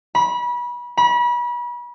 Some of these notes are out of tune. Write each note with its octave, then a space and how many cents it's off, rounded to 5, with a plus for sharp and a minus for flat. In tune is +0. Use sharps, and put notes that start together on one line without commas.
B5 -30
B5 -35